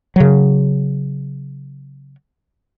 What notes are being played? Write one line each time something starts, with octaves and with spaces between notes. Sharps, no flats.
C#3 F#3